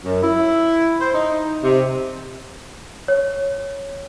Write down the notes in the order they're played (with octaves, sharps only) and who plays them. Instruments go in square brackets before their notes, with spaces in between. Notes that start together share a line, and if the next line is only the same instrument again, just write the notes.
[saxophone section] F#2
E4
C5
D#4
C3
[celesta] C#5